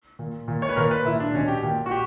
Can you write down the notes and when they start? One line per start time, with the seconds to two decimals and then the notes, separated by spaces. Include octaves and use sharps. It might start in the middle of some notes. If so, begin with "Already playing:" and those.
0.19 A#2
0.48 A#2
0.62 C#5
0.69 B4
0.76 A#2 A#4
0.91 B4
1.05 A#2 E4
1.20 D4
1.34 B2 C#4
1.48 G4
1.63 A#2
1.86 F#4
1.91 G4